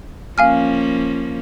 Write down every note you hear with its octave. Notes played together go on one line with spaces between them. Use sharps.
F3 A#3 C#4 F5 G#5 F6